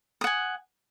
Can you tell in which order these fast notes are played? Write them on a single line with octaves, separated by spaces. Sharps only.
D#6 F#5 G#5